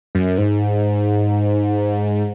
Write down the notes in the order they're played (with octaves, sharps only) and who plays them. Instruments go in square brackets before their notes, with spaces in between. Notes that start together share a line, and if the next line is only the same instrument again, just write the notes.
[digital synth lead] F#2
G#2